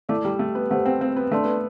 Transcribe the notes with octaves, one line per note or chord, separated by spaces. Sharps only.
A3 E4 A4 D5 A5 D6
G3
A3
B3
A3 G4 C5 F#5
C4
C4
B3
A3 D4 A4 D5 A5 C6
B3